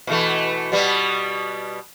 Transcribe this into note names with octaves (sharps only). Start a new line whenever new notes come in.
B2 E3 A3
B2 G3 B3